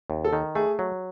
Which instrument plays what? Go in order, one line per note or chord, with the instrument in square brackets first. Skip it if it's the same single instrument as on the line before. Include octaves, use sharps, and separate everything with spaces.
[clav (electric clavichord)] D#2
[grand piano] A4
[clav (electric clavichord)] D#3
[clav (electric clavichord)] A3 [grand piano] G#4
[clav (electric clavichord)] F#3